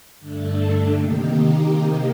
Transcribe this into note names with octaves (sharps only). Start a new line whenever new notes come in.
G2 D3 A3 D4 A4
C3 D#3 A#3 D#4 G4